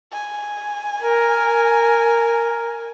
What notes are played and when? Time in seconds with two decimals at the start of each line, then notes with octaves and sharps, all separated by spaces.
0.12 G#5
1.02 A#4